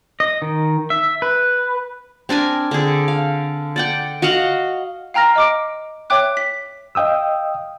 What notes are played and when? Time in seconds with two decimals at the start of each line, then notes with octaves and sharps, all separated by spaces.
0.20 D#5
0.42 D#3
0.90 E5
1.22 B4
2.29 C4 D4 A#4 G#5
2.71 D3 G#4
3.08 F5
3.76 D5 F#5 G5
4.22 F#4 D#5 F5 F#5
5.14 F5 G5 A#5 F6 A#6
5.36 D#5 D6 D7
6.10 C#5 E5 G5 D6 F#6
6.37 B6
6.95 D#5 F5 G5 D#6 E6